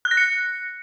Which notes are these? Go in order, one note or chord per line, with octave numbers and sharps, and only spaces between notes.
F#6
A#6
C#7